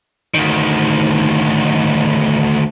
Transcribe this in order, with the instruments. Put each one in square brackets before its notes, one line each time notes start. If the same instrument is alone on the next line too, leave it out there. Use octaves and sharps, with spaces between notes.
[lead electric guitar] D2 D#3